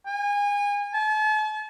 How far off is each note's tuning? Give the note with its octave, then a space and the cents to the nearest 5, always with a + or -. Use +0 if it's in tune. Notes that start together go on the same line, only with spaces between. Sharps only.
G#5 -30
A5 -45